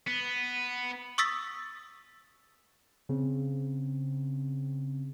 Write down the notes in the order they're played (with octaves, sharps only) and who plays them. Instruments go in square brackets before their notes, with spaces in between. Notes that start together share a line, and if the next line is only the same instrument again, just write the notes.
[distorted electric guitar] B3
[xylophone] C#6 D#6 E6 A6 B6
[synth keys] C#3 C4